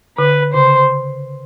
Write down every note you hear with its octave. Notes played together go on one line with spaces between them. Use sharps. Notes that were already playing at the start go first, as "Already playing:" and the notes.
D3 B4
C#3 C5